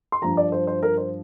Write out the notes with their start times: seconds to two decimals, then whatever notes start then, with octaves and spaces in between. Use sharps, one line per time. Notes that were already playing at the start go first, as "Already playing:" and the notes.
0.12 C6
0.22 G2 F3 A#5
0.37 D5
0.52 C5
0.67 C5
0.83 A#4
0.98 C5